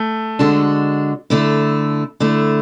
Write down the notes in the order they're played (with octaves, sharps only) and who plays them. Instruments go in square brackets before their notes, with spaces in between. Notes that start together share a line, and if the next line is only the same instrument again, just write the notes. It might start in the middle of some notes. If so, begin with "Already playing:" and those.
Already playing: [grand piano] A3
[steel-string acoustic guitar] D3 G#3 D4 F#4
D3 A3 E4
D3 A3 E4